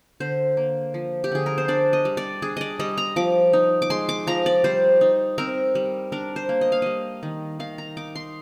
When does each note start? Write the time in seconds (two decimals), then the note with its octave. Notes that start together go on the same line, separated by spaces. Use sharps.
0.20 D3 C5
0.57 A#3
0.94 F3
1.24 G4
1.31 D3 G#4
1.46 A#4
1.58 C5
1.68 D4 D5
1.93 D#5
2.05 G3
2.17 D5
2.42 D4 G#4
2.57 D5 D#5
2.79 G3 D#5
2.97 A#5
3.16 F3 D6
3.53 D#4
3.82 D6
3.90 G#3 C6
4.09 D6
4.27 F3 A#5
4.46 D5
4.64 G3 C5
5.01 D#4
5.38 C4 A#4
5.75 G3
6.12 D4 A#4
6.36 C5
6.49 A#3
6.61 D#5
6.72 F5
6.82 G3 D#5
7.23 D#3
7.60 D#3 F5
7.78 A#5
7.97 D#4 D6
8.15 C6